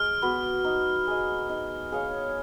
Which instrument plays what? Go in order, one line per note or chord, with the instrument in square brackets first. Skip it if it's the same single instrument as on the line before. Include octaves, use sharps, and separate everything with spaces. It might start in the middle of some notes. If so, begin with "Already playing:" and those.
Already playing: [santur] G#3 [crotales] F6
[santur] B3 F#4 B4
D#4
G#4 D#5
D#4
G#4 C#5 F5